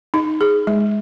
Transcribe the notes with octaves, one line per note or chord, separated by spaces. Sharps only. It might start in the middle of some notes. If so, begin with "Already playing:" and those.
D#4
G#4
G#3